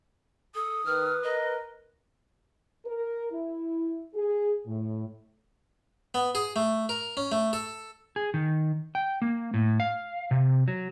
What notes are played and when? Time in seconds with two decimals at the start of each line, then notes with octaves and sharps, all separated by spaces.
0.55 A4 D#6
0.86 D#3 B4 F6
1.24 A#4 D#5
2.85 A#4
3.32 E4
4.14 G#4
4.66 A2
6.14 B3
6.35 G#4
6.56 A3
6.89 A#4
7.17 C#4
7.32 A3
7.53 A4
8.16 G#4
8.34 D#3
8.95 G5
9.22 A#3
9.54 A2
9.80 F5
10.31 C3
10.68 F#3